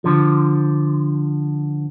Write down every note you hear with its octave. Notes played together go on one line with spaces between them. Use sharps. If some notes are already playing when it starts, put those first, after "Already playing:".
D3 F3